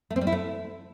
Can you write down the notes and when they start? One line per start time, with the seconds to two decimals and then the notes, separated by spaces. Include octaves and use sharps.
0.10 A3
0.16 C4
0.21 G3
0.27 E4
0.32 A3